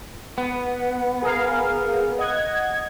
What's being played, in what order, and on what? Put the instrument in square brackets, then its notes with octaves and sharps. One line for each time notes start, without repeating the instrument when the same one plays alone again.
[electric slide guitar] B3
[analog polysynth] G#4 A#4 F5
D#5 F#5 G#6